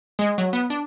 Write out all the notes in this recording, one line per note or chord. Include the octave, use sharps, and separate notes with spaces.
G#3
F#3
B3
D4